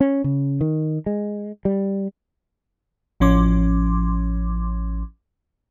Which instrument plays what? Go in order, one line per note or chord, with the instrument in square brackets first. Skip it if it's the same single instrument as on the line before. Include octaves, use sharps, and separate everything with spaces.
[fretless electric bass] C#4
C#3
D#3
G#3
G3
[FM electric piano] A1 F3 C#4 C6 D6